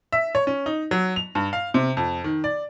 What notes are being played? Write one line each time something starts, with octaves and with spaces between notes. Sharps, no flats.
E5
C#5
C#4
D#4
F#3
F7
G2
F5
C3
F2
D#3
D5